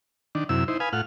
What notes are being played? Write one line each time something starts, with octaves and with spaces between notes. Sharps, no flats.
D#3 D4
F#2 C3 E4 E6
D#4 E4 C5
B4 F5 G#5 D#6
A2 F4 F#5 F6